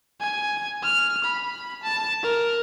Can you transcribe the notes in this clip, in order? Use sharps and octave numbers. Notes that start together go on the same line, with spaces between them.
G#5
F6
B5
A5
A#4